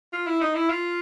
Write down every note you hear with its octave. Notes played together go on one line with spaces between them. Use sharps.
F4
E4
D#4
E4
F4